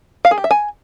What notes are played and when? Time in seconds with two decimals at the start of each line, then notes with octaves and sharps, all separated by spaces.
0.25 F5
0.31 G#4
0.38 G4
0.44 E5
0.51 G#5